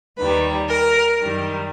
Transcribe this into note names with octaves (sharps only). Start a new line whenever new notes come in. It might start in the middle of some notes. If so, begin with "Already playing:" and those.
D#2 D#3 G3 B4
A#4
F#2 D#3 G3